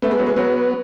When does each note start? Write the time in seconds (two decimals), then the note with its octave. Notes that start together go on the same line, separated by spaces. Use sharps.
0.02 A3 B3
0.11 G#3
0.19 F#3
0.26 G#3
0.36 F#3 B3